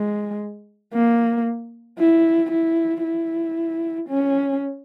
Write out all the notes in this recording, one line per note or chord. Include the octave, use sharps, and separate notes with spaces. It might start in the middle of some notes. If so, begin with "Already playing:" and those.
Already playing: G#3
A#3
E4
E4
E4
C#4